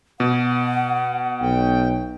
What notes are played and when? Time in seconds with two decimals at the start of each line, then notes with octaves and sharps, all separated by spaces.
0.20 B2 F#5
1.41 B1 G5